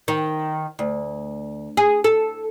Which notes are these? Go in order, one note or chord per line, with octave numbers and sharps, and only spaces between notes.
D#3
D2
G#4
A4